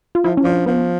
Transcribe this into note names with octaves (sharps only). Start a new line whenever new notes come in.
F4
F3 E4
C#4
F3 D4
F3 B3